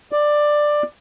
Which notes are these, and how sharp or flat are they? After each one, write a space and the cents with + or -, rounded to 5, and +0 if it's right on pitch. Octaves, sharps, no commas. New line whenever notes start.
D5 +10